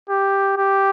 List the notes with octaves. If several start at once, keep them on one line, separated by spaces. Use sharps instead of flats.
G4
G4